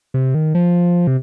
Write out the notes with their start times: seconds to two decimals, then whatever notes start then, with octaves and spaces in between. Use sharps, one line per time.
0.14 C3
0.35 D#3
0.55 F3
1.07 C3